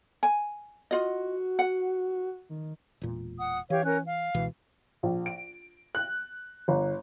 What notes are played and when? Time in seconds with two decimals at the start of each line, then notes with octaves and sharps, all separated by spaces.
0.23 G#5
0.91 F4 F#4 D#5
1.59 F#5
2.50 D#3
3.01 E1 A#2
3.39 F#5 D#6
3.70 E3 G4 C#5 F5
3.86 C#4 A#4 F#6
4.06 F5
4.34 C#2 B2 E3
5.03 A#1
5.26 D7
5.95 F#6
6.68 G1